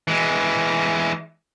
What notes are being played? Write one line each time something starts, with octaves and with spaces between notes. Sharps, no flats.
E3 G#3